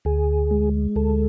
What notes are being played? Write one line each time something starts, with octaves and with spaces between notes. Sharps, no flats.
D2 G#4
G#3
D2 A4